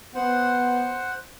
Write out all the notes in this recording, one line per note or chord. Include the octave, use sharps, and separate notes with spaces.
B3 C5 F#5